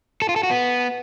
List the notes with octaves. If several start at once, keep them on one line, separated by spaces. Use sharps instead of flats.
A4
F4
A4
F#4
B3